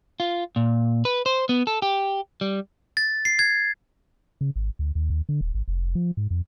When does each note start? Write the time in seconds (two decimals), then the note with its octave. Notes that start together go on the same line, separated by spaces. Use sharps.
0.20 F4
0.56 A#2
1.05 B4
1.26 C5
1.49 B3
1.67 A4
1.82 G4
2.41 G3
2.97 A6
3.25 C7
3.39 G#6
4.41 C#3
4.56 G#1
4.79 D2
4.95 D#2
5.10 D#2
5.29 D3
5.41 D#1
5.54 G#1
5.68 F1
5.95 F3
6.17 G#2
6.31 F2